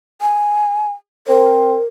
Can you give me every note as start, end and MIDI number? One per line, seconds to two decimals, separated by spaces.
0.21 0.92 80
1.27 1.76 60
1.27 1.85 70
1.27 1.76 72